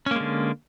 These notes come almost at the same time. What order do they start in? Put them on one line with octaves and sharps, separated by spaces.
C#4 A#3 G#3 D3